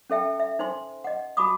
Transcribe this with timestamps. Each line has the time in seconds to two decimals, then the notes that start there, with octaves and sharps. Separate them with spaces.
0.10 C#4 A4 E5 G5 A5
0.40 E5
0.59 D#4 C5 G#5 C6
1.04 D#5 F#5
1.37 F#4 A5 B5 D6 D#6